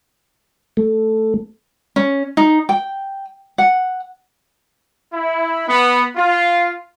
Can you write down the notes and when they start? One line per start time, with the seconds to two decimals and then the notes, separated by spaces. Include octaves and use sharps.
0.77 A3
1.96 C#4
2.37 D#4
2.69 G5
3.58 F#5
5.12 E4
5.67 B3
6.15 F4